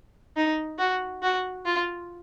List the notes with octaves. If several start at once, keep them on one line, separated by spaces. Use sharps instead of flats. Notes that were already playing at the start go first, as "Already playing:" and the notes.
D#4
F#4
F#4
F4